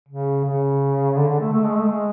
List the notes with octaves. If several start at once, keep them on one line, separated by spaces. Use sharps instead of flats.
C#3
C#3
D3
D3
A3
A3
G#3
A3
G#3